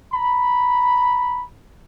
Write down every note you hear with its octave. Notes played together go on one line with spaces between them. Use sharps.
A#5 B5